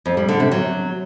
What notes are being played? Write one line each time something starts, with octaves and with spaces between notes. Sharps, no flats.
F2
G3
D3
C3
F#3